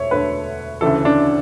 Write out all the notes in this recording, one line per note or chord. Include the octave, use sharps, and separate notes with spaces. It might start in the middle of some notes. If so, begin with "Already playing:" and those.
Already playing: E1 D2 A3 C#5 E5
E1 D2 D3 A3 B4
D2 C#3 E3 A4
D4